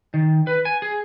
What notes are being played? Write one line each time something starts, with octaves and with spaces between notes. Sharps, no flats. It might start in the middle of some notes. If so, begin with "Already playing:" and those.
D#3
B4
G#5
G#4